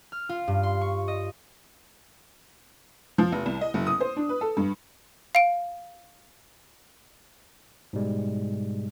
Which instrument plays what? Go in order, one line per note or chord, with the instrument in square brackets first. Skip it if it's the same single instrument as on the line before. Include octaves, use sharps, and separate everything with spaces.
[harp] F6
F4
G2
C6
C#6
D#5
[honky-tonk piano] F3
F1
C2
D#5
F#1
D#6
C5
D4
B4
A4
G2
[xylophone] F5 D7
[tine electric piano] G#2 B2 G3 G#3